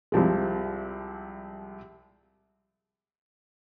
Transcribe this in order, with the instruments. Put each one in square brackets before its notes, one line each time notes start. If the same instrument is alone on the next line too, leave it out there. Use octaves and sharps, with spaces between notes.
[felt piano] C2 C3 F3 G#3